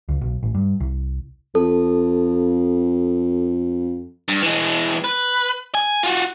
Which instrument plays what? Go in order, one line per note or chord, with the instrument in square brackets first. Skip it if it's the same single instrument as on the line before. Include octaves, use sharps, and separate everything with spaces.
[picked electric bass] C#2
B1
A1
G2
C2
[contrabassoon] F2 [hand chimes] A4
[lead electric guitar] G2
E3 G#3
B4
G#5
F4 F#4